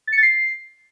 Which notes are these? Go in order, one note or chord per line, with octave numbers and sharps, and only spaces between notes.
A6
C#7
A6
C7